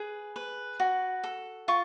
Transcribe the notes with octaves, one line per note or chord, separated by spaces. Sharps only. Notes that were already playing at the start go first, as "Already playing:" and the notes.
Already playing: G#4 B4
B4
F#4
A4
F4 C#6